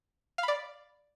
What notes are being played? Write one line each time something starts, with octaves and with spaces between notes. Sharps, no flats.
D5 F5 B5